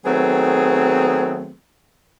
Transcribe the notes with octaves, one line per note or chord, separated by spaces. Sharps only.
D#3 F#3 A3 B3 C4 G#4